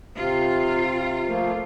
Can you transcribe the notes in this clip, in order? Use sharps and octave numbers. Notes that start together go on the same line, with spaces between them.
C3 F4
F3 A3 A#3